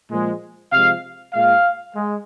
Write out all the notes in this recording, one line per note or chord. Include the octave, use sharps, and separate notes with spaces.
A#2 F3 G#3
C3 F3 G#3 F5
A#2 G#3 F5
G#3